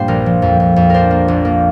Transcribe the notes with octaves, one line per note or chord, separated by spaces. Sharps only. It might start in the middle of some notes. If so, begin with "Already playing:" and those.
Already playing: G2 A#2 G3 A#3 D4 C5
A#1 A#4
F3
F2
F2
F2
D4 A#4 C5
A#3
A#1
A#3